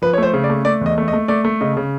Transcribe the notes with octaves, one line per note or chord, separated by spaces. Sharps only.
F3 B4
C#5
A3 C5
C#3
D5
A3
A3 D5
E2 D#5
A3
D#5
A3
A3 D5
A3
C#3 D#5
C#3